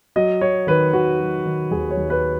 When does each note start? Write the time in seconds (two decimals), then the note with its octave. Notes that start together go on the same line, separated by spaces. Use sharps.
0.16 F#3 D#5
0.41 F#3 C#5
0.67 D#3 B4
0.93 D#3 F#4
1.19 F#3
1.45 D#3
1.71 D#2 G#4
1.91 C#5
1.97 D#2
2.10 B4